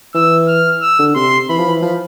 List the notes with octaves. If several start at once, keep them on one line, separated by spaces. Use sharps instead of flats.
E3 E6
F6
E6
D3
C3 C6
E3 B5
F3
E3
F3